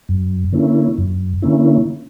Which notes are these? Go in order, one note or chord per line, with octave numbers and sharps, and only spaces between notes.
F#2
D3 A#3 C#4 E4
F#2
D3 A#3 C#4 E4